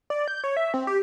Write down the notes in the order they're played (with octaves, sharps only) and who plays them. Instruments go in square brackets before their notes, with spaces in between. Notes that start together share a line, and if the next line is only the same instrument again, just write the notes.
[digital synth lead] D5
G6
C#5
E5
C4
G4